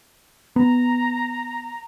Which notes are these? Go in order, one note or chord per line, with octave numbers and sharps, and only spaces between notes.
B3 A#5